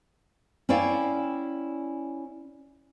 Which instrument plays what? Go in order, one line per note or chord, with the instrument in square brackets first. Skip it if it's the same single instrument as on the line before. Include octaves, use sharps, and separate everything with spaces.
[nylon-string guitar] C#4 E4 C#5 D5 F5 G5